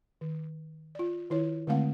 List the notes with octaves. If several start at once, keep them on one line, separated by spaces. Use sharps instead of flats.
D#3
F4 D5
D#3 E4 C#5
D3 G#3 A3 C4 F5 F#5